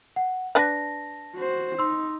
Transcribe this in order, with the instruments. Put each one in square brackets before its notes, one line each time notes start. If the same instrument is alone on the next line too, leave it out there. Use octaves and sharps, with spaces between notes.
[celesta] F#5
[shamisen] D4 B4 F#5 [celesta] A5 A#6
[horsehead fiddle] F#4 C5
[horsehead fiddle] D#4 [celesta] C6 E6